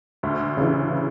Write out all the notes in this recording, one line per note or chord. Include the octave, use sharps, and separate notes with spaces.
D2
C#3 E3